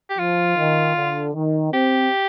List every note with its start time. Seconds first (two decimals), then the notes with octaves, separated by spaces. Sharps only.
0.10 G4
0.19 F3 F4
0.57 D#3
0.95 D3
1.35 D#3
1.73 C4 G4